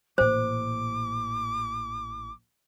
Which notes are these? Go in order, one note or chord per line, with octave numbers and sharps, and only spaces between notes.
A1 A#2 C5 D6